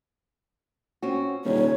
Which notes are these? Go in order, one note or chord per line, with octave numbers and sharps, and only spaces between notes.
C4 C#4 F#4
D#1 C3 D4 C#5